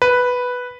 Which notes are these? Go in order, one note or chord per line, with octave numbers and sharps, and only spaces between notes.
B4